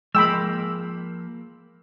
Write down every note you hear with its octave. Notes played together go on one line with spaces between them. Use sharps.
F3 G#3 A#3 G5 B5 E6